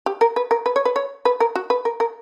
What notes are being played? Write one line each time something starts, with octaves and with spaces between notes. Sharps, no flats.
G4
A#4
B4
A#4
B4
C#5
B4
C#5
B4
A#4
F#4
B4
A#4
A#4